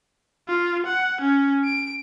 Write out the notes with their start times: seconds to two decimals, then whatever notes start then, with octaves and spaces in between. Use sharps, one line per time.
0.48 F4
0.86 F#5
1.21 C#4
1.64 D7